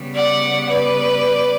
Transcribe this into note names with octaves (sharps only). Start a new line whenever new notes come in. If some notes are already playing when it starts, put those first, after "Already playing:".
Already playing: C#3 G3 B3
D5 F#5
B4 D5